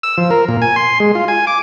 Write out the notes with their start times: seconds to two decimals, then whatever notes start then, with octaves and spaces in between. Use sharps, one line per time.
0.03 E6
0.18 F3
0.30 A#4
0.48 A#2
0.62 G#5
0.76 C6
1.00 G#3
1.15 F4
1.28 G#5
1.47 D6